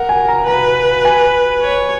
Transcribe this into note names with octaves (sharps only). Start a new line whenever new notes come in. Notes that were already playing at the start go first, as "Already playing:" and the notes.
Already playing: A#4 F#5
G#5
A#5
B4 A#5
G#5
C#5